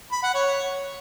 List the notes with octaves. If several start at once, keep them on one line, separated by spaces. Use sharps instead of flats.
B5
F#5
C#5